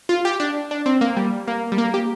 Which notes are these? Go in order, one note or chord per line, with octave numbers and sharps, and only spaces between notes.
F4
G4
D4
D4
C4
A#3
G3
A#3
G3
A#3
G4